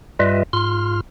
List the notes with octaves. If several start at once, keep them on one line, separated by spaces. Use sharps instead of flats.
G2 G3 F4 B4 D#5 E5
G#2 F4 C6 F6